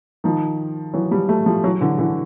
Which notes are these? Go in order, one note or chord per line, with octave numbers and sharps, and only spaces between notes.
D#3 F3
E3 F#3
F3 G3
G3 A3
F3 G3
E3 F#3
D3 E3
D3 E3